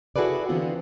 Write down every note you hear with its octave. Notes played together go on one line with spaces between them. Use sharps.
E4 F#4 G#4 A4 B4 D5
D3 E3 B3 C4 F4 G#4